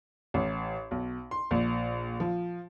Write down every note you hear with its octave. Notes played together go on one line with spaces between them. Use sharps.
A1
B1
C6
A#1
F3